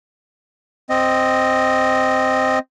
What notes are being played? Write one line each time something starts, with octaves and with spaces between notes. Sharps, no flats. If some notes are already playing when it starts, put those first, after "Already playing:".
C4 D#5